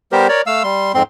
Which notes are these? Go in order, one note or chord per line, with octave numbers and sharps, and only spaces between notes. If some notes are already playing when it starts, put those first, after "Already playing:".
G3 B3 G4 A#4 C5
A#4 C#5 D5
A3 F5 E6
G3 C6
F2 G#2 C4 C6